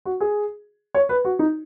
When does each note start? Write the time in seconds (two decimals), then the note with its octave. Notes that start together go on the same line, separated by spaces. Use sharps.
0.05 F#4
0.21 G#4
0.95 C#5
1.09 B4
1.25 F#4
1.39 D#4